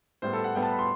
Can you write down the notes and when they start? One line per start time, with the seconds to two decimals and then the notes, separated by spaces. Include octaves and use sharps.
0.22 A2 G3 B3 C5
0.33 A4
0.44 F#5
0.55 A2 G3 B3 G5
0.62 A5
0.71 B5
0.79 C6